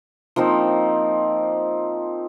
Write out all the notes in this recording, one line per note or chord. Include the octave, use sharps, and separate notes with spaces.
F3 A#3 C4 D#4